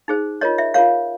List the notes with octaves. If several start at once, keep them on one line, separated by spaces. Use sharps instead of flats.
D#4 G#4 C5
F4 A#4 C#5 D#5
E5
F4 A#4 C#5 F5